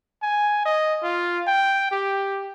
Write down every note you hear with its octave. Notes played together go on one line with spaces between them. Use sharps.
G#5
D#5
F4
G5
G4